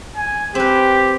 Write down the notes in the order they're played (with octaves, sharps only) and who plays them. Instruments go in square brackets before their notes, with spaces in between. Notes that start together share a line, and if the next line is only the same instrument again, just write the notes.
[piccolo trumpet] G#5
[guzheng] C4 B4 [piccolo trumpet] G4